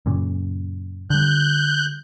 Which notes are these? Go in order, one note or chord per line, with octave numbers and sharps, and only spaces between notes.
F#2 A#2 C#3
D3 G3 F#6 G6